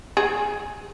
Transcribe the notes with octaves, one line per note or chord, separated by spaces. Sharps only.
G#4